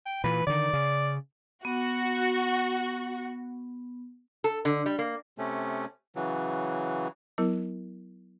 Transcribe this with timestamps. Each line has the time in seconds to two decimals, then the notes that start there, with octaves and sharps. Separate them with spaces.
0.06 G5
0.24 A#2 E3 B4
0.47 D3 D#3 D5
0.73 C#3
1.65 B3 F#4
4.44 A4
4.65 D3
4.86 G3
4.99 A#3
5.38 C3 A3 C#4
6.16 C#3 E3 F#3
7.38 F#3 B3 E4 A#4